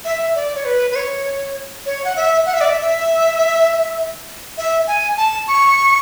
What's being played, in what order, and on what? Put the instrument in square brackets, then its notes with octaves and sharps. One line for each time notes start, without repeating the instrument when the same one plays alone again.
[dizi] E5
D5
C#5
B4
B4
C#5
C#5
F#5
E5
F#5
E5
D5
E5
E5
G#5
A5
C#6